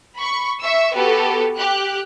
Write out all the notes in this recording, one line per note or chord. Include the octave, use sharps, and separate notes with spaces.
B5 C#6
E5 C#6 E6
B3 F#4 G4 A4 B4
G4 F#6